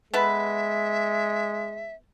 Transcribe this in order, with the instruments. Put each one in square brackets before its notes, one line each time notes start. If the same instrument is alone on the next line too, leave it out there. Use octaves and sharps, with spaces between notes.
[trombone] G#3 [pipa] B3 A4 B4 [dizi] E5